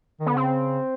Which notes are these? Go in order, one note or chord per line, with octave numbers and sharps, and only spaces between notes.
D#3
D3 B3
C#3 C4